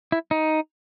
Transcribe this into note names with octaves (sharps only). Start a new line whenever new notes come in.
E4
D#4